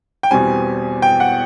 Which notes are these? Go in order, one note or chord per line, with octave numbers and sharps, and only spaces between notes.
G5
E2 B2 G3 C4 G#5
G5
F#5